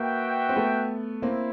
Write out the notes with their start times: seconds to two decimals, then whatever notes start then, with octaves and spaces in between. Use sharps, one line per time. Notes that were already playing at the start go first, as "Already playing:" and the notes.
Already playing: A#3 F#4 B4 E5 G5
0.49 C4
0.56 A3 B3
1.22 A#3 C4 E4